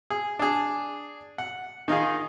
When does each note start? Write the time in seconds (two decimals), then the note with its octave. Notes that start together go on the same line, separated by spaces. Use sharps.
0.10 G#4
0.39 D4 G#4
1.38 F#5
1.88 D#3 D#4 F4 G#4